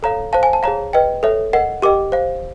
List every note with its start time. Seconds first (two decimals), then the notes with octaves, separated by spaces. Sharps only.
0.03 A4 C#5 F5 A#5
0.33 C5 F5 A5
0.43 G#5
0.53 A5
0.63 G#4 C#5 F5 A#5
0.93 B4 D#5 G5
1.23 A4 C#5 E5
1.53 A#4 D#5 F#5
1.82 G4 A#4 D#5 G5 D6
2.12 C5 F5